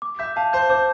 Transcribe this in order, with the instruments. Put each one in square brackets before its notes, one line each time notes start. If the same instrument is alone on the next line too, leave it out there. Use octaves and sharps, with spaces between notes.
[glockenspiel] D6
[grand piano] E5 [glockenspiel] G6
[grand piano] F5 [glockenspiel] A5
[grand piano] C5 [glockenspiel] G6
[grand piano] C5 [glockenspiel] D6